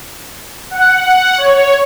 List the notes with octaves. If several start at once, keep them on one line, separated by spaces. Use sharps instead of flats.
F#5
C#5